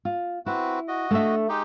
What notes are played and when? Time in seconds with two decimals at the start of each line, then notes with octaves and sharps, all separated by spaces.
0.05 F4
0.46 C4 E4 F#4 B4
0.88 F#4 D#5
1.11 A3 D4 E5
1.49 G#3 D#4 G4